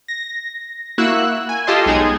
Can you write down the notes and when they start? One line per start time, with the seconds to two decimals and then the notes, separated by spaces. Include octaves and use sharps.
0.08 A#6
0.98 A#3 E4 F#4 E6 F#6
1.49 G#5
1.67 F4 G4 A4 D#5 C6
1.86 B1 G#3 D#4 G#4 G#6